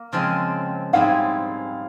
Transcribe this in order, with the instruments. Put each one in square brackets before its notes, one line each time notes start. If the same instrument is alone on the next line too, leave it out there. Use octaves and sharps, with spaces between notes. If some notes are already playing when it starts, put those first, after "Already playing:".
Already playing: [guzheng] A#3
C#3 F3 G#3 C4
[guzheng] G#2 G3 C4 E4 G#4 [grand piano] F5